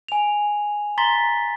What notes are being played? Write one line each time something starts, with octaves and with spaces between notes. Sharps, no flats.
G#5 F7
A#5 C6 A6 B6 G7